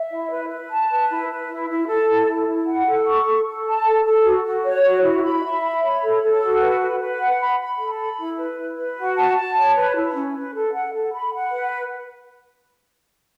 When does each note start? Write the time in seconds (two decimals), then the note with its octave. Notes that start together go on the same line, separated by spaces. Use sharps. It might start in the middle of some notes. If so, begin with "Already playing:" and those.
Already playing: E5
0.10 E4
0.30 B4
0.50 B4
0.70 A5
0.89 B4
1.10 E4
1.29 B4
1.48 E4
1.69 E4
1.87 A4
2.08 E4
2.27 E4
2.47 E4
2.67 F#5
2.87 A4
3.06 C#6
3.26 A4
3.45 A4
3.66 A5
3.85 A4
4.04 A4
4.24 F#4
4.45 F#4
4.64 C#5
4.83 F#4
5.02 E4
5.22 B5
5.43 E5
5.62 B5
5.81 C#5
6.02 A4
6.22 A4
6.40 F#4
6.61 B4
6.80 B4
7.00 B4
7.19 F#5
7.40 B5
7.59 B5
7.78 A4
7.98 B5
8.18 E4
8.38 B4
8.57 E4
8.77 B4
8.97 F#4
9.17 A5
9.35 A5
9.56 C#5
9.76 B4
9.95 E4
10.14 C#4
10.34 B4
10.54 A4
10.74 F#5
10.93 A4
11.14 B5
11.33 F#5
11.52 B4